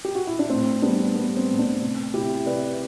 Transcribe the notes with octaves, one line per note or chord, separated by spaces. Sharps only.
G4
F#4
E4
D4
A2 C4
G3 B3 D4
G3 B3
C4
A2
B3 D4
C3
C3 E4 G4
C3 B4 D5